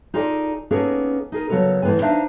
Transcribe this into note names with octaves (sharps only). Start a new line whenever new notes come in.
D#4 F4 G#4 A4 D5
A#3 B3 C#4 D#4 G#4 A4
D#4 G#4 A#4
C#3 F#3 B3 A4 A#4
A2 E3 G#3 B3 G#5
D4 D#4 C5 E5 F5